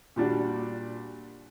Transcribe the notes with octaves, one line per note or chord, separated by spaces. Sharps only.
A#2 G3 D4 F#4